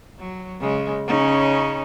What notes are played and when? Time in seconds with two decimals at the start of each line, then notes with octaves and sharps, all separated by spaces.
0.19 F#3
0.60 C#3 G#3
1.07 C#3 C#4 D#4